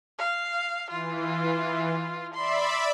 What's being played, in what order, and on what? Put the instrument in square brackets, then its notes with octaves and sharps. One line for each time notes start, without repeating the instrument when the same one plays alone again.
[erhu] F5
[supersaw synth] E3 [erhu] F4
[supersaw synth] D5 E5 B5 [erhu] C6